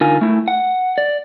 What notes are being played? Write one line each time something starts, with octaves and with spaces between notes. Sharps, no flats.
D3 D#4 F4 A#4 G#5
A3 E4
F#5
D5